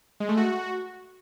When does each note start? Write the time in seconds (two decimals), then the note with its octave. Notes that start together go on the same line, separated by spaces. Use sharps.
0.20 G#3
0.29 A3
0.37 F#4